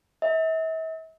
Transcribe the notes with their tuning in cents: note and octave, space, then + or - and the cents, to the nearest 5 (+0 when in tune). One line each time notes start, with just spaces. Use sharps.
E5 -40